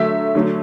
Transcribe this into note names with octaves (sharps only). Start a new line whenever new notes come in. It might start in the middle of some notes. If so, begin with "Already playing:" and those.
Already playing: D3 F#3 A3 E5
D3 F#3 A3